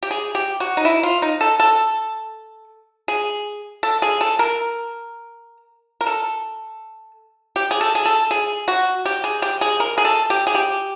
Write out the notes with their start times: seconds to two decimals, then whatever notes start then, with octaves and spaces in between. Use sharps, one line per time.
0.03 G4
0.11 G#4
0.35 G4
0.60 F#4
0.77 D#4
0.85 E4
1.03 F4
1.22 D#4
1.41 A4
1.60 A4
3.08 G#4
3.83 A4
4.02 G#4
4.21 A4
4.39 A#4
6.01 A#4
6.07 A4
7.56 G4
7.71 G#4
7.81 A4
7.95 G#4
8.06 A4
8.31 G#4
8.68 F#4
9.05 G4
9.24 G#4
9.42 G4
9.61 G#4
9.80 A#4
9.98 G#4
10.05 A4
10.30 G4
10.47 G#4
10.55 G4